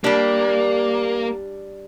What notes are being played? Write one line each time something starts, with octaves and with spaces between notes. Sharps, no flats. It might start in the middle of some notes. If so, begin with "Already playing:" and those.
G3 A#3 D4 G4